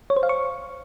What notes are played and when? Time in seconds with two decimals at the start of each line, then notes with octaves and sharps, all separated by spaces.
0.10 C#5
0.17 C5
0.23 F5
0.29 C#6